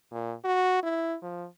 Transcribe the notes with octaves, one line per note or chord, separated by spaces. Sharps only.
A#2
F#4
E4
F3